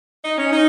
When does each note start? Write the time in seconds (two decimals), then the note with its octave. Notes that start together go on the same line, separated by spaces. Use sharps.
0.25 D#4
0.38 C#4
0.52 D#4